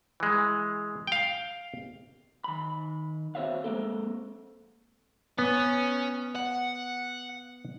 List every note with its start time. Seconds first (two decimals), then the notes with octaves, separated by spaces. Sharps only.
0.20 E3 G#3
1.07 F5 G5
2.44 D#3 B5
3.35 C4 F#4 C5 C#5 E5 F5
3.64 G#3 A#3 C4 A4
5.39 B3 C#4
6.35 F#5